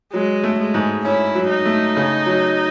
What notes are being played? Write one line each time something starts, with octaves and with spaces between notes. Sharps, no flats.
F#3 G#3
A3
G#3
G#2
C#4 E4
F#3
D#4
A3
C#3
F#3